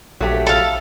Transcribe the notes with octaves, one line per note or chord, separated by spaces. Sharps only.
A#1 F#3 A3 G4
A4 F5